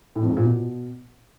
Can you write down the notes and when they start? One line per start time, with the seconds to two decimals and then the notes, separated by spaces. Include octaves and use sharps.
0.15 A2
0.23 F2
0.30 G#2
0.37 A#2
0.44 B2